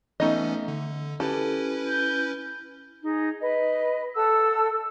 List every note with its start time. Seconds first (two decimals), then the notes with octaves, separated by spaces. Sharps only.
0.20 E3 A3 B3 C#4 D#4 D#5
0.68 D3
1.20 C#4 E4 G4 A4 B4
1.87 G6
3.03 D#4 G#4
3.40 B4 D#5
4.15 A4 F#5 A5 E6